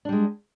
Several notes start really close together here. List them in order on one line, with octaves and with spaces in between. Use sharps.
D4 G3 G#3